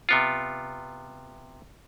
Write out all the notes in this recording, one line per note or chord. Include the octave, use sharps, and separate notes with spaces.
C3 B3 F4